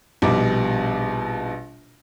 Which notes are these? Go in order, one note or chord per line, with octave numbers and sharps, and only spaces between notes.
A#1 B2 G3 D#4 D6